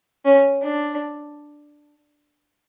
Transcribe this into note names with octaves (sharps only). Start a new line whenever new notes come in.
C#4
D4